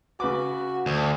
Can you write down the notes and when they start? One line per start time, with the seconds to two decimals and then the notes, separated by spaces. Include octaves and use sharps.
0.20 C#3 F#4 B4 D6
0.86 D2